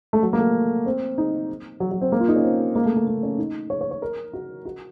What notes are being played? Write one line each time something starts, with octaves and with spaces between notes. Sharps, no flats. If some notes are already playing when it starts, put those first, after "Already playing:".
A3
F#3
A#3
A3
C4
D#4
F#3
F#3
C4
A#3
F4
D#4
C#4
C4
A#3
A3
A3
A#3
C#4
D#4
C#5
C#5
C#5
A#4
F#4
F#4